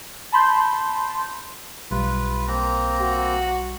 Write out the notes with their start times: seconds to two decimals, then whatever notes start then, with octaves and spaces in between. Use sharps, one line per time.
0.32 A5 B5 C6 G6
1.91 B1 G3 F4 B4
2.48 A#3 C4 A#5
3.01 F#4